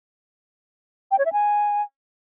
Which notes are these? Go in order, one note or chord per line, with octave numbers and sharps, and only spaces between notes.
G5
C#5
E5
G#5